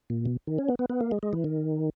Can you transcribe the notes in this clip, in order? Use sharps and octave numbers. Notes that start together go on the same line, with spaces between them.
A#2
B2
D#3
C#4
B3
B3
B3
A#3
G#3
G#3
E3
D#3